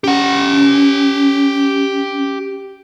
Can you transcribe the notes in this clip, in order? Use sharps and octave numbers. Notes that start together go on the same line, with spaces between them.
C#4 G4 F#5